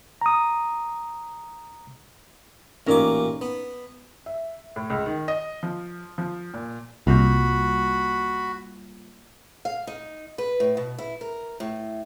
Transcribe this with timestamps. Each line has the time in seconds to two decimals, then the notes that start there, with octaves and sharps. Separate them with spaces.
0.21 A#5 D#6
2.87 A1 A#2 C#4 D#4 A#4 D6
3.41 B3
4.26 E5
4.76 A2
4.90 C#2
5.06 D#3
5.28 D#5
5.63 F3
6.18 F3
6.54 A#2
7.07 C2 G3 A#3 F4 F#4 B5
9.65 F5
9.87 D#4
10.38 B4
10.60 A2
10.77 B2
10.98 E4
11.21 A#4
11.60 A2